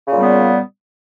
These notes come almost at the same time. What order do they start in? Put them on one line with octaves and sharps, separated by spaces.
C#3 A#2 G3 B3